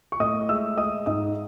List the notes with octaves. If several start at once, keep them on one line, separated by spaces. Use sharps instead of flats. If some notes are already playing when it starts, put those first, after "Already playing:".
C#6
A2 D#5 D#6
G#3 E5 E6
G#3 D#5 D#6
G#2 D#5 D#6